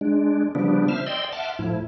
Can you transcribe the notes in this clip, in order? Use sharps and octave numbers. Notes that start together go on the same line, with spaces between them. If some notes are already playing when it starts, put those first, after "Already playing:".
G#3 D4
C#3 F3 G3 B3 D4
C5 E5 F6
D5 D#5 G5 C6 E6
E5 F#5 A5 C6 D6 F6
A2 F3 E4